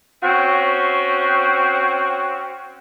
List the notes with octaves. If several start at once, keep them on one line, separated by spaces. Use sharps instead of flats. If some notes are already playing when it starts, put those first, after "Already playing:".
C4 C#4 F#4